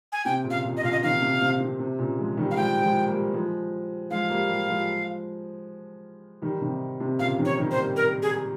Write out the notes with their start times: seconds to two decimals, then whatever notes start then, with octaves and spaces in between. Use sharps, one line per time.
0.12 G#5
0.25 C3 G5
0.44 A#2 C#3
0.50 F5
0.64 A#2
0.77 D#5
0.83 A#2 C#3 F5
0.92 D#5
1.02 C3 D#3 F5
1.22 C3
1.41 C3
1.60 C3
1.79 C3
1.98 A#2 C#3
2.18 F3 G#3
2.37 D#3 G3
2.51 F5
2.56 F3 G#3 G5
2.82 F3 G#3
3.08 G3 A#3
3.34 F3 G#3
4.10 F3 G#3 F5
4.30 G3 A#3
4.49 G3 A#3
4.68 F3 G#3
6.42 D#3 G3
6.61 C3 D#3
7.00 C3
7.19 A#2 C#3 F5
7.38 C3 D#3
7.45 C#5
7.58 D#3 G3
7.71 C5
7.77 G3 A#3
7.96 A#4
8.22 G#4